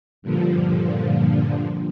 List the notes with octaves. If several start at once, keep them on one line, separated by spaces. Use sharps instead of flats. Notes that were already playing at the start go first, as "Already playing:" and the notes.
G2 A#2 D3 F3